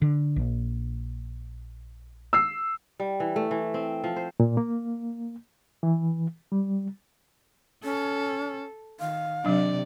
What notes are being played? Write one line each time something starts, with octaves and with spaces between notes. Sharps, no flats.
D3
A#1
E6 C7
G3
E3
A3
E3
C4
F3
C5
A#2
A#3
E3
G3
C#4 A4
D#3 F5
C3 F#3 D4 D5